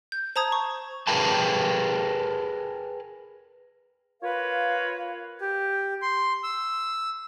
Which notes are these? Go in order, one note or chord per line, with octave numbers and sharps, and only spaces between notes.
G6
C5 A5 A#5 D#6 G#6
C#6
G#4 A#4 B4 G5 A5
F4 A#4 B4 C#5 F5
G4
C6
E6